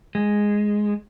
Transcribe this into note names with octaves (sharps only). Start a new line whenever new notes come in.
G#3